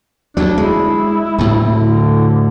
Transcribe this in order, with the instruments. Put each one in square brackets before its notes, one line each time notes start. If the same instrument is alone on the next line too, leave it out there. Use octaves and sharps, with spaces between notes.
[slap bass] D2 F#3 [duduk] D4
[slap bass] G#3 [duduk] E4
[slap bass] D2 A2
[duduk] D3